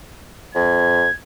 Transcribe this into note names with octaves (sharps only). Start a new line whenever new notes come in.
F2 G#6